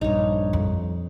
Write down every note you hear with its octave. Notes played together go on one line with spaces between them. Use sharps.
A#1 G2 D#4 C#5
F2